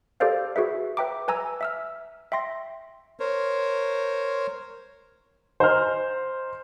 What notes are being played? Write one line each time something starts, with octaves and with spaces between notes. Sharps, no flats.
G4 A4 A#4 C5 D5 F5
F#4 G#4 B4 E5
B4 E5 G5 A#5 D6
B4 G#5 A#5 E6
E5 E6 F6
E5 G5 C6 A#6
A#4 C5 C#5
C5 D#5 G#5 A#5 C6 F6